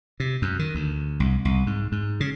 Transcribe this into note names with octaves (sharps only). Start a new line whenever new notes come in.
C3
F#2
D#3
D2
C2
C2
G#2
G#2
C#3